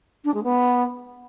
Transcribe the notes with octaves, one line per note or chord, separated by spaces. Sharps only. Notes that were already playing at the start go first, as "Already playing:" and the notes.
D4
G#3
B3